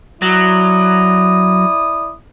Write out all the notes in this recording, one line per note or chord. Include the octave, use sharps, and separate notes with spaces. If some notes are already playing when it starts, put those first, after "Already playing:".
F#3 E4 D5 D#6